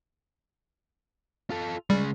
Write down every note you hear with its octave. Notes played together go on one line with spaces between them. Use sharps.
F4 A4
C#3 G3 G#3